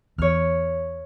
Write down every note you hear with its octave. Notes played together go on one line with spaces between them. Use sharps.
E2 C#5 F6